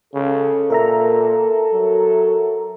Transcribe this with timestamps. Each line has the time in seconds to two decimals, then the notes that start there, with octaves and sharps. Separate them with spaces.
0.14 C#3 A4
0.70 A#2 A#4 E5 A#5
1.73 F#3